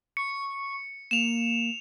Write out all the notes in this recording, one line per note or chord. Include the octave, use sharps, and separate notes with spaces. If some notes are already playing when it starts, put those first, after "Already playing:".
C#6 C#7
A#3 E7 F7